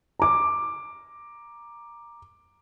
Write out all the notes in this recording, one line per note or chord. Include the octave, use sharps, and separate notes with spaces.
A#5 D6